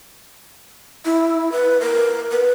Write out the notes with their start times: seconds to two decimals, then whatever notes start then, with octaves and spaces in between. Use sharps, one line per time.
1.05 E4
1.52 B4
1.81 A#4
2.30 B4